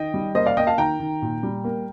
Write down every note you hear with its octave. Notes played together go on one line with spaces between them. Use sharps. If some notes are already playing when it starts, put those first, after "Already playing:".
Already playing: D#3 D#5 G5
G3
A#3 C5 D#5
D5 F5
A#3 D#5 G5
F5 A5
D#3 G5 A#5
D#3
A#2
G3
A#3